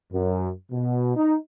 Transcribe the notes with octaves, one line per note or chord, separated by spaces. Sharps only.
F#2
B2
D#4